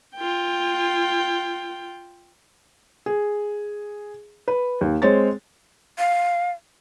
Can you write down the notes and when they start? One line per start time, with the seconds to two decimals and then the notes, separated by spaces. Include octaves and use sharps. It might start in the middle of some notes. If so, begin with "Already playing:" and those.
0.16 F4 G5
3.06 G#4
4.48 B4
4.81 D#2
5.02 G#3 C4 C#5 A6
5.99 F5